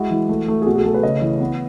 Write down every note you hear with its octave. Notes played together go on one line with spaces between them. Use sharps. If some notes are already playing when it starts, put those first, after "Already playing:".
Already playing: G#3 E4 F#4
E3
A3
A3
G#4
B2 F#4
G#4
A3 A4
B4
C#3 D#5
E3
B3